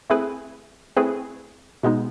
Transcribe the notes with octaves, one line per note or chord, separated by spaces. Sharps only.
A3 C4 E4 G#4 B4
A3 C4 E4 G#4 B4
B2 G#3 B3 D#4